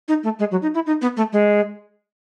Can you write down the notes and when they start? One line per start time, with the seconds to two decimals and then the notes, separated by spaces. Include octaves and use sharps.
0.08 D#4
0.24 A3
0.39 G#3
0.51 F#3
0.62 D#4
0.75 E4
0.86 D#4
1.02 B3
1.17 A3
1.33 G#3